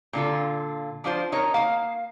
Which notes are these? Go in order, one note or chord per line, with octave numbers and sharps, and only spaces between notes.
A#2 D3 F4 A4
F3 D4 F4 C5
D#4 A#4 C#5
A#3 F5